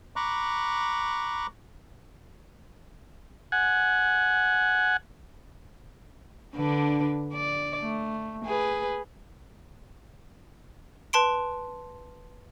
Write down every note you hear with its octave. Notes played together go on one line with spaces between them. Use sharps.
A#5 B5 C#6 D6 F#6
F#5 G#5
D3 D4 B4
D5
A3
G#4 B4
B4 A5 C6 D7